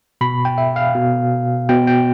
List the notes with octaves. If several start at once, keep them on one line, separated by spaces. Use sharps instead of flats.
B2 B5
G5
E5
F5
B2
B2 G5
G5